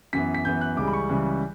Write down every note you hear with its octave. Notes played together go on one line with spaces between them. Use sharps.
F#2 E3 B3 B6
B6
F#2 E3 B3 G6
F#6
C#2 C#3 E3 G3 D6
B5
C#6
C#2 C#3 E3 G3